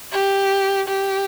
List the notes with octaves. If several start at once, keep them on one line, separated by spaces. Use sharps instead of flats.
G4
G4